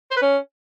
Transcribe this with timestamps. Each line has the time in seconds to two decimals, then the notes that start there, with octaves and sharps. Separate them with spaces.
0.11 C5
0.17 B4
0.22 C#4